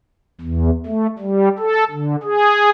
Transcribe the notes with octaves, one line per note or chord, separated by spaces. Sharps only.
E2
A3
G3
A4
D3
G#4